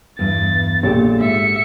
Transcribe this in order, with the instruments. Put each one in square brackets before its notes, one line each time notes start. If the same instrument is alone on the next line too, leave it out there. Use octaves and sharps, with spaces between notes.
[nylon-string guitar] E2 G2 [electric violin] A6
[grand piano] A#1 A#2 [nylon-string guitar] G4 A4 C#5
[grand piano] G#2 [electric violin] E5 C#7